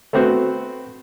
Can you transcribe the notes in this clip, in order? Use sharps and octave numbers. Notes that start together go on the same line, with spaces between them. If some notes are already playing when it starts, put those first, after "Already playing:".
A3 B3 C4 F#4 C5